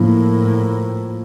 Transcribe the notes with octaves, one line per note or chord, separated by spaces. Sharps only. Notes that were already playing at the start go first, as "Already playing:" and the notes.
Already playing: A2 F3 A#3 E4